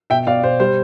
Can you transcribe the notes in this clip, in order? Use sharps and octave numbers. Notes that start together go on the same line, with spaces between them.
B2 E5 G5
B2 D5 F5
B2 C5
G3 C5